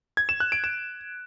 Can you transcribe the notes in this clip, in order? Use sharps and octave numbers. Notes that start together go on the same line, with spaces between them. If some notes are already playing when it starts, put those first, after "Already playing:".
G#6
E7
F#6
D7
E7